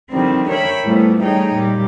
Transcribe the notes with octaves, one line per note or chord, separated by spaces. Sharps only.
D3 D#3 F3 G3 C4 E4
A#4 C#5 E5 G5 B5
A2 E3 F3 G3 A3 B3
G3 A3 D#4 G#4 C#5 G5
A#2 G3 G4